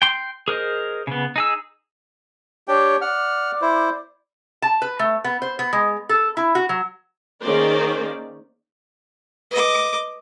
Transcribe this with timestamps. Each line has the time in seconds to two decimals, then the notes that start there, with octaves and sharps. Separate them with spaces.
0.02 G5 C6
0.48 G#4 A#4 C5 D#5
1.07 C#3 B3
1.36 D#4 G#4 E6
2.68 D4 G4 C#5 G5
3.01 D5 F#5 F6
3.62 E4 C5
4.62 A5
4.82 B4
4.99 A3
5.24 B3
5.42 C5
5.59 B3
5.73 G#3
6.09 A4
6.37 E4
6.55 F#4
6.69 F#3
7.42 D#3 A#3 C#4 G#4 C5 D5
9.51 B4 D#5 D6